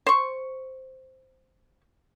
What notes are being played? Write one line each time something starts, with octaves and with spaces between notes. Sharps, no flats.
C5 C#6